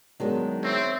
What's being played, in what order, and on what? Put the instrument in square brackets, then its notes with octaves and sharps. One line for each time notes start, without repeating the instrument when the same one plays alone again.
[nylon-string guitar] D#3 G#3 B3 [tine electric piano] F#3 D4
[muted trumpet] C4 [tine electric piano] C#5 E5